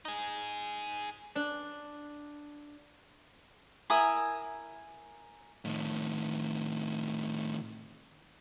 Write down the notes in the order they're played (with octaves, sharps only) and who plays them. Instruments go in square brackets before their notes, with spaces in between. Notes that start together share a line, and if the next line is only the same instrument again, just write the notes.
[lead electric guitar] D#4 G#4
[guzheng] D4
[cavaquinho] E4 A#4 G#5 D#6
[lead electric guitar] A2 D#3